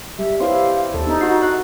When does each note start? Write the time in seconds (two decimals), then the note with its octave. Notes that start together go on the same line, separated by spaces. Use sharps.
0.19 G3 E5
0.40 C4 E4 G4 B4 C#5 F5 C6
0.94 D#2 A4
1.07 B3 D4 D#4
1.21 F#4 C7
1.42 D#5 F#6